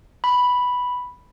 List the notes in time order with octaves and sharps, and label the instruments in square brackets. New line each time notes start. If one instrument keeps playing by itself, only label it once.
[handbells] B5